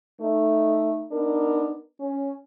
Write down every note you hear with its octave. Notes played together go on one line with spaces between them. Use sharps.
A3 D#4
B3 D4 D#4 A#4
C#4